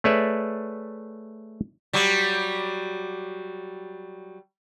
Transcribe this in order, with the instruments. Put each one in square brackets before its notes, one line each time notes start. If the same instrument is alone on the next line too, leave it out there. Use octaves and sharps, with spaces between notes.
[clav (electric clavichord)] A3 G#4 B4 C#5 D5 E5
[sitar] F#3 G3